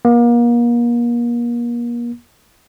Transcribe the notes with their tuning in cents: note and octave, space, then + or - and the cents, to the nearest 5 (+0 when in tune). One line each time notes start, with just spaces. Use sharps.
A#3 +35